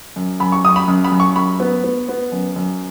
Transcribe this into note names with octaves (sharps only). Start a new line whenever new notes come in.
F#2
F#2 B5
C#6
F#2 D#6
B5
F#2
B5
F#2
C#6
F#2 B5
B3
B3
B3
F#2
F#2